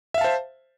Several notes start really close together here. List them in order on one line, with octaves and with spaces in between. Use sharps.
E5 F5 A5 C5